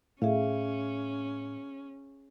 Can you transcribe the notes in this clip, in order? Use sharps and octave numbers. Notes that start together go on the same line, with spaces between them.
A2 C#4 G#4 E5 F5